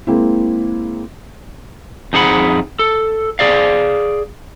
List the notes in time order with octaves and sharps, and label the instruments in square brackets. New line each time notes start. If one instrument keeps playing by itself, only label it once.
[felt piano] G#3 A#3 C4 E4
[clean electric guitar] F2 D#4 G#4 F#5 B5
A4
G#4 D5 F5